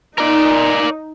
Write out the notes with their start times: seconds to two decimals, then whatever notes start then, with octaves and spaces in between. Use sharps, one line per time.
0.18 D#4 A#4 D5